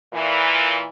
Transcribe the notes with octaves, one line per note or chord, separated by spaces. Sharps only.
A#2 E3